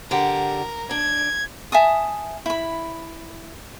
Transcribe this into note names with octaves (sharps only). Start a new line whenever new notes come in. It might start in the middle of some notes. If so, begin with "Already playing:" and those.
D3 G4 A#4 F#5
D4 G#6
E5 G#5 A5 D#6
E4 B5